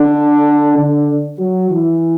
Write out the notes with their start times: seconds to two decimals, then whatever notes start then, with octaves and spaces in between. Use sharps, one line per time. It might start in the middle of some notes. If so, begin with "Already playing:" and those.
Already playing: D3 D4
0.77 D3 D4
1.39 F#3 F#4
1.70 E3 E4